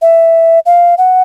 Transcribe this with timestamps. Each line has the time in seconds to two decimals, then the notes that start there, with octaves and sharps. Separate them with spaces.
0.02 E5
0.66 F5
0.98 F#5